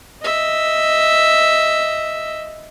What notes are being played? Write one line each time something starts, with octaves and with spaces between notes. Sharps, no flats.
D#5 E5